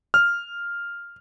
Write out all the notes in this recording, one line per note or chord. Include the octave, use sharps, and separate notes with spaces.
F6